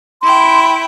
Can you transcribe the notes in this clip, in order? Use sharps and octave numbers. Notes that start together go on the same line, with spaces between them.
E4 G5 C6